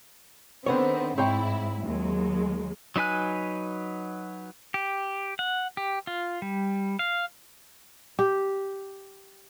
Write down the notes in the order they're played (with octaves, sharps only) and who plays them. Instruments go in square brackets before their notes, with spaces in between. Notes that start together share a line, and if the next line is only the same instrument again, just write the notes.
[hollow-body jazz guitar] D3 B3 C#5 [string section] D#3 C4
[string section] G#2 E4 [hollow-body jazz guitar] C4 C#5 G5
[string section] D#2 F#3 G#3
[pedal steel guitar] F#3 D#4 B4 G#5 F#6
G4
F#5
G4
F4
G3
F5
[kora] G4